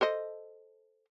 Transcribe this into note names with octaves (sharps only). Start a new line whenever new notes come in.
A4 C5 D#5